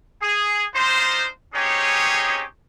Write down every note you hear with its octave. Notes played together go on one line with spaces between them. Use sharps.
G#4
D4 D#4 F4 C5
C4 C#4 D#4 G4 G#4 C#5